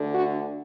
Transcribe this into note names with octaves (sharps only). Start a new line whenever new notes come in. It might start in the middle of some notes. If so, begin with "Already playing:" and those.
Already playing: D2 D3
D4 F#4